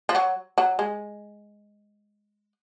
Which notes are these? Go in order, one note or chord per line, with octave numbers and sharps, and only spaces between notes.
F3
F#3
F#3
G#3